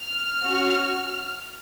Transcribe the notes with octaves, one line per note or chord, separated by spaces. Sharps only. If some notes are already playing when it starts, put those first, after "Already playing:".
Already playing: F6
C#4 F#4